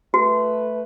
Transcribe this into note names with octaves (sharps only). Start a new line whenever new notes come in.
A3 F#4 B4